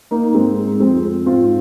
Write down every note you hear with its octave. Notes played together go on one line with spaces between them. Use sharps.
A#3 D#4
G#2 G#3 C4
F2 G#3 C4
G#2 C4 F4